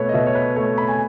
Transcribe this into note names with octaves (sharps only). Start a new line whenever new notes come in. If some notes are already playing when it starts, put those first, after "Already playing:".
Already playing: B2 A3 B4 C#5
D#5
B2 E5
C#5
B4
A3 C#5
B5
G#5